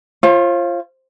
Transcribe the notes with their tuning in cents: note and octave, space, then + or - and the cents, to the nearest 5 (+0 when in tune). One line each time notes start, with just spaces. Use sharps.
F4 -15 C5 +45